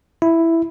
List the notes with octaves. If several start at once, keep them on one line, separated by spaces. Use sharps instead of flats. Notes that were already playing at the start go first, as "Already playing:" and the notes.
E4